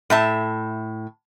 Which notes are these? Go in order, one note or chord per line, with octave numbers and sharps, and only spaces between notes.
A2 E5 A5